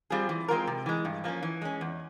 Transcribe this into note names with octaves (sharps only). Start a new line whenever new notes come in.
G3 C4 F4 G#4
E3
G#3 C4 F4 A#4
C3
E3 G#3
G2
F3 A#3 C#4
E3
G#3 C#4
E2